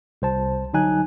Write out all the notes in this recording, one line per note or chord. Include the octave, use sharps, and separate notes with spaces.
C2 C5 A5
D3 F#3 D#4 G#5 F#6